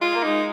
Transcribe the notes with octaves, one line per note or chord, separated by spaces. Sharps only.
G#3 F4
A#3
G#3 D#4